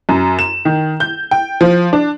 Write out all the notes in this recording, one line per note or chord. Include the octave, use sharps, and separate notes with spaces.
F#2
E7
D#3
G6
G5
F3
D4